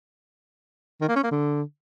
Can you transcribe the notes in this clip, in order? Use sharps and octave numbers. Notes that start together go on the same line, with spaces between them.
D#3
A#3
C#4
A#3
D3